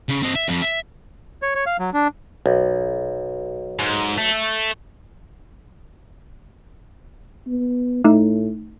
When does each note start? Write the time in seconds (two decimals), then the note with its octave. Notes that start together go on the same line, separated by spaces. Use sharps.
0.09 C#3
0.22 C4 D#5
0.35 E5
0.48 F2
0.62 E5
1.42 C#5
1.55 C#5
1.66 F5
1.80 F#3
1.94 D4
2.46 B1
3.79 G#2
4.18 A3
7.47 B3
8.04 A2 A3 D#4